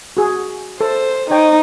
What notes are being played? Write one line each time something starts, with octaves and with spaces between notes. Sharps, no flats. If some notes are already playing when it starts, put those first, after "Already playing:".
F#4 G#4
A4 C5
D#4 C5 C#5 G5